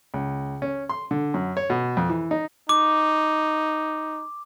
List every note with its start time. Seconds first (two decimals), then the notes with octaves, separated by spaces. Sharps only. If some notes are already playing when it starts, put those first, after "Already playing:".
0.14 C#2
0.62 C#4
0.89 C6
1.11 D3
1.34 F#2
1.57 C#5
1.70 B2
1.97 F2
2.09 E3
2.31 D#4
2.69 D#4 D6